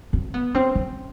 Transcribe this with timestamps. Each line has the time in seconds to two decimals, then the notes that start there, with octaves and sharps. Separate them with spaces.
0.13 C4
0.34 B3
0.55 C4
0.75 C#4